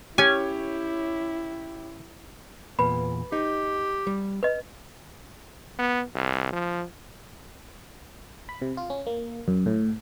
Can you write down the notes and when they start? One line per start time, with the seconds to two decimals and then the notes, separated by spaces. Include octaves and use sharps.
0.18 C#4 E4 G4 C#5 G#5
2.79 E2 A#2 B4 B5
3.32 D#4 G4
4.07 G3
4.43 B4 D#5
5.79 B3
6.15 C2
6.52 F3
8.49 B5
8.62 C3
8.77 F4
8.90 C#4
9.07 A#3
9.48 F#2
9.66 A2